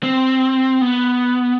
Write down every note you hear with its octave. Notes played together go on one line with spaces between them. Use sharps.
C4
B3